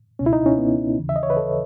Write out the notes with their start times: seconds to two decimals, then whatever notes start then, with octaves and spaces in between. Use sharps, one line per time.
0.19 C#2 B2 C#4
0.26 E4
0.33 D#4
0.46 C#4
0.59 B3
0.98 D#2 C#3 E3
1.09 E5
1.16 D#5
1.23 C#5
1.30 B4
1.37 A4